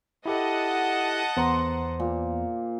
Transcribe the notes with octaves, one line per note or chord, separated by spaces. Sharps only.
E4 G4 A4 D#5 F#5 A5
E2 B3 C5 A#5 D6
A#2